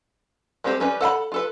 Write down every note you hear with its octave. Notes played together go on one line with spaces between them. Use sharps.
G3 G#3 C4 G4 A4
G3 C#4 B4
A4 F#5 G#5 B5
F4 A4 B4